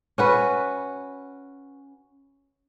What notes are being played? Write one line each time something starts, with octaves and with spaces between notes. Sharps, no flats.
C#4 F#4 B4